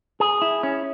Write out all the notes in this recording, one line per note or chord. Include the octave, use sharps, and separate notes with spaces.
G#4
E4
C#4